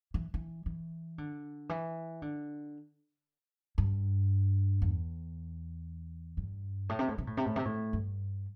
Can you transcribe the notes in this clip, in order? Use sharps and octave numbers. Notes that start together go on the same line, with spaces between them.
E3
E3
E3
D3
E3
D3
G2
E2
G2
A2
C3
A2
C3
A2
C3
A2
C3
A2
G2